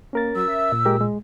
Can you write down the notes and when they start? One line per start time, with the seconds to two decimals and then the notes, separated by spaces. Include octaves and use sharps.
0.13 A#3 C#4 A#4 A6
0.35 F#3 E6
0.48 E5
0.72 A#2
0.85 G#3 G4 A#4
1.01 G#3